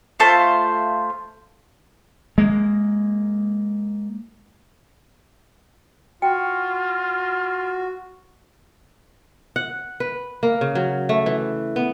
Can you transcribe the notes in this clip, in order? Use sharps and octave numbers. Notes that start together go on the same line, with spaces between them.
A3 F4 C5 A5
G#3 A#3
F4 F#4 G5
F#5
B4
A#3
C#3
F#3
A3
E3
B3